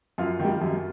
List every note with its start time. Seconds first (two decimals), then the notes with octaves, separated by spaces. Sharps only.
0.18 F#2 F4
0.40 D#3 G3
0.61 F#2